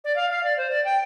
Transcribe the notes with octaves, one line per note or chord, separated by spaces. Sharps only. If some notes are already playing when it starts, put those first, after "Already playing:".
D5
F5
F5
D5
C5
D5
G5